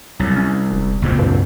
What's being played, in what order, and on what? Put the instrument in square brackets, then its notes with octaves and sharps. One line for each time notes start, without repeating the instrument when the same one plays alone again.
[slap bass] C2 [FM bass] F#3
[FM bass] C#4
E1
[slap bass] C#2 A#2 C4
[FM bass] G2